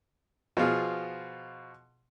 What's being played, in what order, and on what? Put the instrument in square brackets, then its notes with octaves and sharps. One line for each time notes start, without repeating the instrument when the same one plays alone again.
[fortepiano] B2 F3 F4 G#4